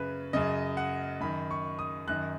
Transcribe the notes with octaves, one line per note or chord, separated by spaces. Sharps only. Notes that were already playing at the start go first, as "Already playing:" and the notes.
Already playing: F#2 C#3 B4
F#2 C#3 D#5
F#5
F#2 D#3 B5
C#6
D#6
F#2 D#3 F#6